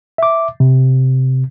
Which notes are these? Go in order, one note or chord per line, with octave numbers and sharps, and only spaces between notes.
E5 D6
C3